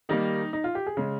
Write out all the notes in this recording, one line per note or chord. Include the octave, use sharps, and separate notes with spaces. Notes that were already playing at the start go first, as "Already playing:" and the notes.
D#3 G3 A#3 D#4
D#4
F4
G4
G#4
C#3 G#3